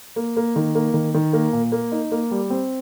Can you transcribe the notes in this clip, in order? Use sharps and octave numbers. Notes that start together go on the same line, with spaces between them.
A#3
A#3
D#3
A#3
D#3
D#3
A#3
A#2
A#3
D#4
A#3
G3
C4